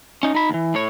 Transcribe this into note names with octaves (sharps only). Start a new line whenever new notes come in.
C#4 D#4
D#4 B5
D#2 E3
A2 C#5